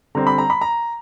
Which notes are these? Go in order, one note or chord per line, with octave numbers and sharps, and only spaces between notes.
D3 G3 C4 A#5
B5
A#5
B5
A#5